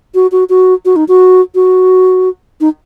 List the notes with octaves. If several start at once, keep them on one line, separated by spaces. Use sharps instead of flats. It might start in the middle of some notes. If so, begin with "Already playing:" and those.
F#4
F#4
F#4
F#4
D#4
F#4
F#4
D#4